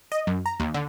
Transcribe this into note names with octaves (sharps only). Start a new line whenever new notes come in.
D#5
F#2
A#5
D#2
D3